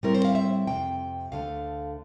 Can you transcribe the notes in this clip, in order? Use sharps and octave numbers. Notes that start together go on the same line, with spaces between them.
A2 G3 C4 E4 A#4
C5
F5
E5
F2 C3 F3 A#3 G5
D2 D3 A3 F5